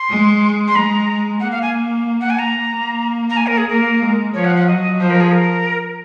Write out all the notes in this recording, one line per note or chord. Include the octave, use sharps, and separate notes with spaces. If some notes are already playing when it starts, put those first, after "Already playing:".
Already playing: C6
G#3
C6
G#3 A#5
A#3 F#5
F5
G#5
F#5
G#5
A#5
A#3
A#5
G#5
A#4
G#4
A#3 A#4
G#3
F3 C#5
F#5
F#5
F#3 D#5
F3 C5
A#4
G#4
A#4